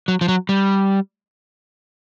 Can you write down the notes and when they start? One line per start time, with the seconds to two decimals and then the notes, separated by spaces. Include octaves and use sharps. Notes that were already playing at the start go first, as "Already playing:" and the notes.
0.08 F#3
0.21 F3
0.28 F#3
0.49 G3